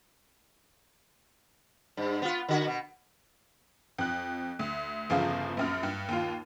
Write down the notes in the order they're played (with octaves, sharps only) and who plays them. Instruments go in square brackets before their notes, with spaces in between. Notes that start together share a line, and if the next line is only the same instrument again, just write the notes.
[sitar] G2
B3 F4
D3 F#4
B2
[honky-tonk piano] F2 F#6
D2
G1 E2 C#3 F3 F5
A#1 F#2 F6
G2
D#2 F4